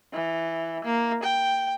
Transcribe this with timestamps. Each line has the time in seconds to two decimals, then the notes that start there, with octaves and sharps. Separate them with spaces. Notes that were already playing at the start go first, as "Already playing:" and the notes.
0.13 E3
0.84 A#3
1.23 G5